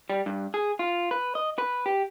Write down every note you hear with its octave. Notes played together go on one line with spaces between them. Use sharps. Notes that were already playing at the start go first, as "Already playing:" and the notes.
G3
G2
G#4
F4
B4
D#5
B4
G4